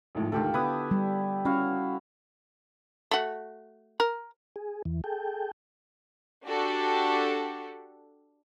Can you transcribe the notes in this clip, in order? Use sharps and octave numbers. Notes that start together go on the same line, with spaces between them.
G#1 A2 F3
D2 G#2 D#3 F4 G4 A4
D3 B3 E4 D6 D#6 F#6
G3
C#4 E4 F#4 F5
A3 F#4
A#4
G#4
E2 E3
G#4 A4 G5
D4 F#4 G4 A4